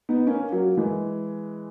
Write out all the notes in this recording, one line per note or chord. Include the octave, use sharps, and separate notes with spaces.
B3 D#4
A#3 C#4
F#3 A#3
E3 G#3